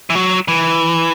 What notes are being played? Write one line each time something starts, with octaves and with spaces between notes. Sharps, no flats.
E3
F#3
E3